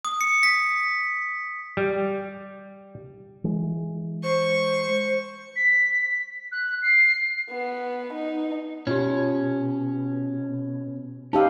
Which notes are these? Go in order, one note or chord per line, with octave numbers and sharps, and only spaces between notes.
D#6
C#7
B6
G3
E3 G#3
C5 C#6
B6
F#6
C7
B3
D#4
B2 C#4 F4 G4
C#4 D#4 G4 B4 F5 A5 E6